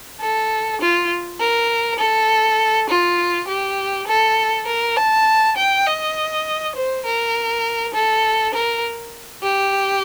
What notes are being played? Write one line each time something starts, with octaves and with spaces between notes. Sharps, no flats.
A4
F4
A#4
A4
F4
G4
A4
A#4
A5
G5
D#5
C5
A#4
A4
A#4
G4